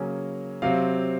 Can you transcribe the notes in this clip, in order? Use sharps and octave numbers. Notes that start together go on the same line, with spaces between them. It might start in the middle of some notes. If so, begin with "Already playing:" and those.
Already playing: C#3 F#3 A#3 C#4 G#4
C3 F#3 C4 F5